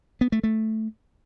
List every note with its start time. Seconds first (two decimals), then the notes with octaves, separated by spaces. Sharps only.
0.21 B3
0.32 A3
0.44 A3